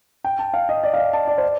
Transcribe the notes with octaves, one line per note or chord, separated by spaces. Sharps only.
G5
A5
F5
D#5
D5
F5
D#5
A5
D5
C5
D5